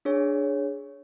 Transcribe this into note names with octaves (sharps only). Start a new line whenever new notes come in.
D4 G#4 C#5